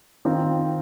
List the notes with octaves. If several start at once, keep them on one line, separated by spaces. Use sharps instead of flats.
D#3 C4 F4